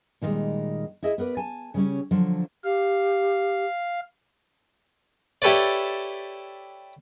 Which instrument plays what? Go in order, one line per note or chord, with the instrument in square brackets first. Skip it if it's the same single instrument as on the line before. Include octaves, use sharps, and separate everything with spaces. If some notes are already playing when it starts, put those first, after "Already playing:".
[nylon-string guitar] A#2 D#3 E3 G3 G#3
E4 G#4 D#5 E5
B3 A#4 B4 D5
G#5 A5
C#3 G3 C#4
D3 F3 F#3
[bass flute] G4 [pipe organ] F5
[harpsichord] E4 G4 A4 B4 C#5 D5